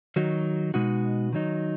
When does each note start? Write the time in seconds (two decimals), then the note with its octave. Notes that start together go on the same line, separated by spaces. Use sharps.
0.16 D#3 F#3 D#4 F#4
0.74 B2 G#3 D#4 F#4
1.33 D#3 F#3 D#4